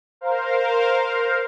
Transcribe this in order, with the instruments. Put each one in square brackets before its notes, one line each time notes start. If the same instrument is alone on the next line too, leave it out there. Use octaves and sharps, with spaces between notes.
[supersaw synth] A#4 C5 F5